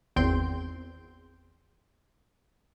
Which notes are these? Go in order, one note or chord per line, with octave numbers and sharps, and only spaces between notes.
G#1 E2 C4 G5 C6 G6